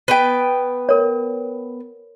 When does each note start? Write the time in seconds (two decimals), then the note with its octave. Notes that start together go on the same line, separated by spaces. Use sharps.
0.08 B3 B4 G5
0.89 A#4 C#5